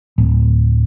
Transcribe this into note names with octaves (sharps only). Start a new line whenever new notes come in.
D1